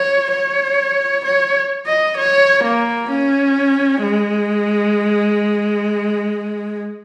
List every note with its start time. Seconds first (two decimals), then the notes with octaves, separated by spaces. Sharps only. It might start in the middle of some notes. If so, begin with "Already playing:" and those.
Already playing: C#5
0.32 C#5
1.25 C#5
1.86 D#5
2.17 C#5
2.63 A#3
3.09 C#4
4.02 G#3